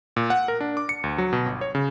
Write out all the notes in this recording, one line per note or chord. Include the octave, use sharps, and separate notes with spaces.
A#2
F#5
A#4
D4
D6
C#7
D2
F#3
B2
G1
C#5
C#3